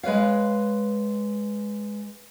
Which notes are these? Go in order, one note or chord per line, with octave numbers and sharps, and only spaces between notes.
G#3 B4 C#5 F5